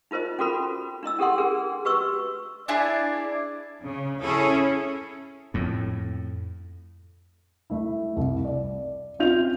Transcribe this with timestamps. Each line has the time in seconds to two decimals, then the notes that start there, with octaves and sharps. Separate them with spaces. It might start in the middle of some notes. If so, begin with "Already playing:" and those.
0.11 D#4 F4 A#4 C5 D#5
0.39 C#4 F4 F#4 A4 A#4 B5
1.03 D4 E4 D#5 E6
1.19 C#4 G4 A4 F#5 C6
1.38 D4 G#4 A#4
1.85 F#4 G4 B4 D#5 C#6 E6
2.68 D4 E4 G#4 D5
3.86 C#3
4.23 C#4 E4 G#4 A4
5.54 F2 A2
7.70 A3 E4
8.17 C2
8.45 D5
9.19 C4 C#4 F4 G6 F7